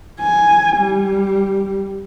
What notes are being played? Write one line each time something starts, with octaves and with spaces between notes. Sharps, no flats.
G#5
G3